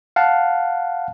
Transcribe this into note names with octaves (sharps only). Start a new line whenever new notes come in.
F5 F#5 A5